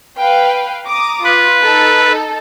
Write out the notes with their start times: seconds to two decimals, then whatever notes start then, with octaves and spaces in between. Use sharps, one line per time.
0.19 B4 F5 G5
0.86 A#5 D6 D#6
1.24 F4 B4
1.61 D#4 A4